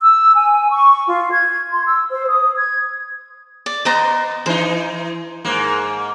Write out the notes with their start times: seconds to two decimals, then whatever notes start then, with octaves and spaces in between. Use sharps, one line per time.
0.01 E6
0.36 G#5
0.71 C#6
1.08 F4
1.32 G#6
1.71 C6
1.86 E6
2.11 C5
2.28 D#6
2.57 G#6
3.66 D5
3.85 B3 C5 D#5 A#5
4.46 E3 D#4 C5
5.45 G#2 A#3